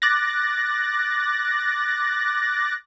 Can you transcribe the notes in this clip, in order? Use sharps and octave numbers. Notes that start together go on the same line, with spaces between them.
D6 F#6 A6 A#6